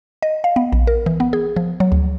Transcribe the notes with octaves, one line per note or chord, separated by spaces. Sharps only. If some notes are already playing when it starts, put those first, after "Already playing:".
D#5
F5
B3
A#1
A#4
E3
B3
G#4
F3
F#3
D2